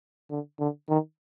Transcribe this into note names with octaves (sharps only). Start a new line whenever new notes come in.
D3
D3
D#3